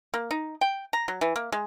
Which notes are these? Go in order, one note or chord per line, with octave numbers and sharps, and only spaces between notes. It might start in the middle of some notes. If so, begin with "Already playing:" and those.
A#3
D#4
G5
A#5
F#3
E3
A#3
G#3